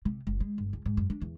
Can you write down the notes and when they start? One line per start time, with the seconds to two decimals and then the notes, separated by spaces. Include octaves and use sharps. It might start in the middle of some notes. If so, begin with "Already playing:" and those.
0.05 C3
0.27 F#1
0.40 G#3
0.58 G1
0.73 C#2
0.86 G#2
0.97 F#2
1.10 D4
1.21 E2